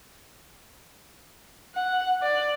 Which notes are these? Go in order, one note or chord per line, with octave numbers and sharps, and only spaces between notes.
F#5
D5